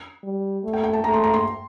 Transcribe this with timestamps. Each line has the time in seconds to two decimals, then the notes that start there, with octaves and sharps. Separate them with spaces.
0.23 G3
0.64 A3
0.73 G5
0.84 G5
0.93 A5
1.04 A3 A#5
1.14 C6
1.24 A#5
1.34 C6